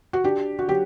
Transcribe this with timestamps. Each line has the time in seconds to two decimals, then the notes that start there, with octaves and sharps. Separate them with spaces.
0.13 F#4
0.24 D4 G4
0.59 F#4
0.68 F#3 G4